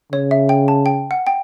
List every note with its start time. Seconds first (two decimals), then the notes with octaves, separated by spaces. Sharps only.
0.12 C#3 C#5
0.31 E5
0.49 G5
0.68 A5
0.86 G5
1.11 F#5
1.27 G5